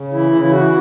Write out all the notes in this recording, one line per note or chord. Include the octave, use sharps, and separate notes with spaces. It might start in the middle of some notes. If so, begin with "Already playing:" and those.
Already playing: C#3
E3 E4
C#3
E4
E3 F#4